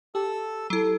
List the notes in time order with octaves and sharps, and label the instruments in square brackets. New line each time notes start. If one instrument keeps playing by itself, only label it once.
[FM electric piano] G4 [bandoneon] A4 E6
[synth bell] F#3 E4 [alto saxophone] A4